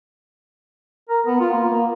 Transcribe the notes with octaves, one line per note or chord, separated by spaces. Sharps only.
A#4
B3
F4
A#3
A#3